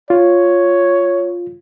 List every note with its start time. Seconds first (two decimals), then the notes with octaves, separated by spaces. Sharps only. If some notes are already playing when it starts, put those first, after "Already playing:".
0.10 F4 C#5